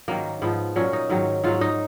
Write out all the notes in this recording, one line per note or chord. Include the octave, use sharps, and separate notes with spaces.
G#2 D#3 F#3 A#3
G#2 F3 B3
A#2 F#3 C#4
D#4
G#2 D#3 F#3
G#2 F#3 F4
D#4